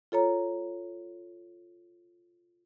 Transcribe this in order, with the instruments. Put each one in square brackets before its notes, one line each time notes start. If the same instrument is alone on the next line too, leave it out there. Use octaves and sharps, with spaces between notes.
[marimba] F4 A4 C#5 A#5